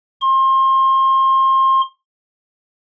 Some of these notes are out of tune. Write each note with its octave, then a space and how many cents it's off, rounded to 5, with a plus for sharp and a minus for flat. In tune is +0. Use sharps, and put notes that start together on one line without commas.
C6 +30